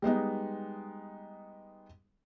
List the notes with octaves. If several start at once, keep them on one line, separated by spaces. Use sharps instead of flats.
G3 G#3 B3 D#4